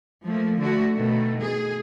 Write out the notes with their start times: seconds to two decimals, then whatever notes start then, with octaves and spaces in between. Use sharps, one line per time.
0.25 F3 A3 A#3
0.59 D3 A3 F#4
0.95 B2 D#3 A3
1.41 G#4